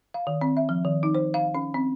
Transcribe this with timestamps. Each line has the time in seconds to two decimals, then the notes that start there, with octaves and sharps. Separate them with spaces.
0.14 F5
0.27 D#3
0.41 C4
0.57 E5
0.69 F3
0.85 D#3
1.03 D#4
1.15 C5
1.34 F5
1.55 C#4
1.74 C4